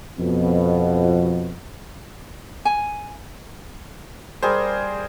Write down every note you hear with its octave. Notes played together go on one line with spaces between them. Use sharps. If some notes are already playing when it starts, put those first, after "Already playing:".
F2 B2
G#5
G3 G#4 A#4 C5